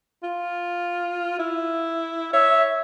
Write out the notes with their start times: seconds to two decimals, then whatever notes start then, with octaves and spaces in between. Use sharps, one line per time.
0.23 F4
1.39 E4
2.33 C#5 E5